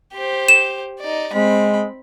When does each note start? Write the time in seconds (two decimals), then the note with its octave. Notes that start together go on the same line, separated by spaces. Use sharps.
0.13 G4 C5
0.48 E7
1.00 D#4 D5
1.33 G#3 C4 B5